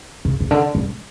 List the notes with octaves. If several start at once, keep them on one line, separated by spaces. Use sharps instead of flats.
C#3
C#3
D3
G3